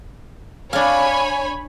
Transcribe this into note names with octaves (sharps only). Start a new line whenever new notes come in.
D4 C#5 F5 G#5 B5